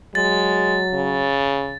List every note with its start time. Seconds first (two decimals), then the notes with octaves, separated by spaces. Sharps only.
0.15 F#3 G#3 A6
0.94 C#3